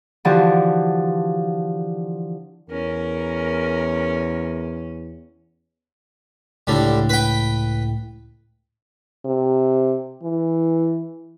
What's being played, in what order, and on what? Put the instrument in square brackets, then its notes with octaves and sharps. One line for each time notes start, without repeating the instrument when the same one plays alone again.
[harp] D3 E3 F3 F#4 G4 A5
[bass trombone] E2 [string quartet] C#4 [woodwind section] A#4
[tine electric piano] C#2 A2 [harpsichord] D3 G3
[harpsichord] B4 G5
[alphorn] C3
E3